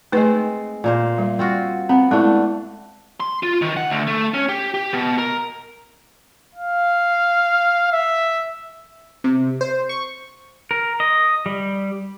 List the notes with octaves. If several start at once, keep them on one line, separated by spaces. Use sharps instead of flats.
G#3 A3 C4 D#4 B4 C5
A#2 A#3 C5
G3
C4 F4 F#4
B3 C4
G#3 A3 D4 E4
C6
F4
D#3
F#5
D2
A3
C#4
G4
G4
B2
A#4
F5
E5
C3
C5
C#6
A#4
D#5
G3